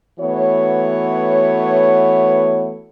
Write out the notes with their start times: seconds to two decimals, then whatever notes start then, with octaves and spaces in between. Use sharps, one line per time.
0.19 E3 A3 B3 F#4 C#5